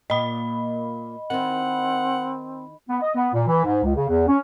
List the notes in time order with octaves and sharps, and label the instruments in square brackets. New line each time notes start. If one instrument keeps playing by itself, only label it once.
[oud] A#2 A#3 [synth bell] D#5 B5
[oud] D#3 E4 [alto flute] C4 [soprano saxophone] F#5
[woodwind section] B3
D#5
B3
A#2
E3
G#2
C#2
C#3
E2
C#4